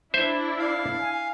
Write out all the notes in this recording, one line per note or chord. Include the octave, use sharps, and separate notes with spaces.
D4 E4 C5 E5
F5
G#5